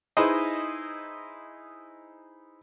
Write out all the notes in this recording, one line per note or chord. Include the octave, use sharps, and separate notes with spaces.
D#4 E4 G#4 B4 C5 D#5